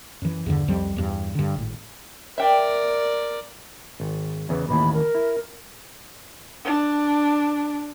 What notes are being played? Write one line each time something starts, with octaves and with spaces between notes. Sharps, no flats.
F#2 E3
E2 G2 D3
C2 F2 F3 G3
E2 G2
G2 D3
G#1 A2
A#4 D5 E5 G5
G#1
E2 C#3 E3
A1 D#2 A2 B5
A#4
E4
D4